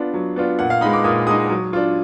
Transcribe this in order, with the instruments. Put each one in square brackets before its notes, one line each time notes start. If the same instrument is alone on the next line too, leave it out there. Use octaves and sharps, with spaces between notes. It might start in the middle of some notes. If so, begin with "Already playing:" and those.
Already playing: [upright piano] B3 D4 F4
F#3
B3 D4 F4
A#2 F#5
F5
G#3 D#4 B5
D6
A#2 D#6
G#3 D#4 D#6
F#3
D4 F4